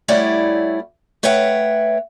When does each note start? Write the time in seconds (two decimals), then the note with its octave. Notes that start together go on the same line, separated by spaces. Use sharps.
0.08 G3 A3 E4 C#5 D5 F#5
1.23 A3 B4 C#5 E5 F#5 G5